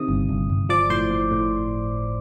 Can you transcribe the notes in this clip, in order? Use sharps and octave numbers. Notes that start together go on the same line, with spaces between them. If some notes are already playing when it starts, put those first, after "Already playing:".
Already playing: C3 D#3 D#6
G1
G1
G1
F3 D5 D6
A2 C5 C6
A2
A2